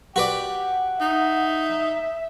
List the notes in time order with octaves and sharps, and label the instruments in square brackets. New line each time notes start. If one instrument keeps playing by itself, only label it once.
[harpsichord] F#4 B4 D5 [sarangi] G4 [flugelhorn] F#5
[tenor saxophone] D#4 [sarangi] E5